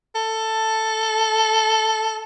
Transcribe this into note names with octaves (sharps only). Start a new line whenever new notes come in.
A4